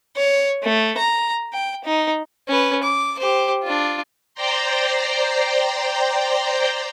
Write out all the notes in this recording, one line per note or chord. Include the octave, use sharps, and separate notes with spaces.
C#5
A3
A#5
G5
D#4
C#4 B4
D6
G4 C5
D4 F4
C5 D5 G5 A#5 C6